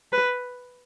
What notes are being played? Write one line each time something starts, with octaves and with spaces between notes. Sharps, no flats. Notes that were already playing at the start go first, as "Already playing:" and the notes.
B4